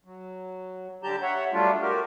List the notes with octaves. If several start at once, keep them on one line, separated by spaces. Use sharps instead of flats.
F#3
D3 G3 G4 A5 A#5 G6
C#5 E5 F#5
F#3 G3 A3 D4 F4
F#4 G4 A#4